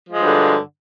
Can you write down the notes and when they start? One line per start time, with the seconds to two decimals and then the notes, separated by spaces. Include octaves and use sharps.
0.08 F3
0.13 G#3
0.17 G2
0.22 F#3
0.27 D3